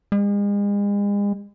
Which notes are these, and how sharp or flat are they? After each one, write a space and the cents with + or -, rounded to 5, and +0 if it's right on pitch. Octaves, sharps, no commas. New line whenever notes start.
G#3 -40